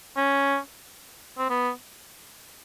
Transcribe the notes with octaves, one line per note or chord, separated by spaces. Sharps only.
C#4
C4
B3